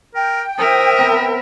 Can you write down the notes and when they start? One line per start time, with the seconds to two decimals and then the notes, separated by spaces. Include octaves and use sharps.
0.15 A#4 G5
0.59 A#4 C5 E5 D#6
0.99 B3 C4